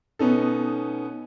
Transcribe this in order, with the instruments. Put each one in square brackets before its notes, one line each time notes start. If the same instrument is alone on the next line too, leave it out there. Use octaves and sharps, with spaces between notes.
[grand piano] B2 B3 C#4 D#4 A4